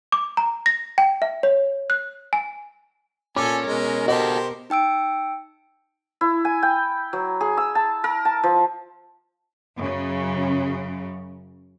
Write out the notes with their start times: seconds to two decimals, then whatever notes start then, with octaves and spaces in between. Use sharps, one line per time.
0.12 D6
0.37 A#5
0.66 A#6
0.98 G5
1.22 E5
1.43 C#5
1.90 F#6
2.33 G#5
3.36 A#2 C#4 A4 G#5 D6
3.66 B2 G#3 A#4
4.08 F#4 G4 A4 C5 D#5
4.70 D#4 G5 E6 D7
6.21 E4
6.45 G#5
6.63 G5
7.13 F#3
7.41 G#4
7.57 E6
7.75 A5
8.04 A#4
8.25 A5
8.43 F3
9.75 F#2 C#3